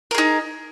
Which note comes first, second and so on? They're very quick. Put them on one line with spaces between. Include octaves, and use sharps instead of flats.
A#4 G#4 D#4